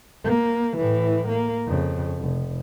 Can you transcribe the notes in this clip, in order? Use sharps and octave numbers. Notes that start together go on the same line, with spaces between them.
A#3
A2 E3
A#3
F2 C#3
F1